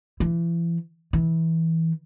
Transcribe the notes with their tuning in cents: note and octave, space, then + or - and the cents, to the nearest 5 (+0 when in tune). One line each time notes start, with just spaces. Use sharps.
E3 +35
E3 -15